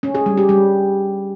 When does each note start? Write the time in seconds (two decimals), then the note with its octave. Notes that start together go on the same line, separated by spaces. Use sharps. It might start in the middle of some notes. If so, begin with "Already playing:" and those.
0.03 C#4
0.15 G#4
0.26 G3
0.37 G4
0.49 G3